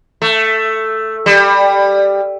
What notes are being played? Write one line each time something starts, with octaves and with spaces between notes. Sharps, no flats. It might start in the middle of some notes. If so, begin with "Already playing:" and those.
A3
G3